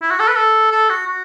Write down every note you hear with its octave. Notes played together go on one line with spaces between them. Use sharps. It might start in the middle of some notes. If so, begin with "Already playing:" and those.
E4
F#4
A4
B4
A4
A4
F#4
F#4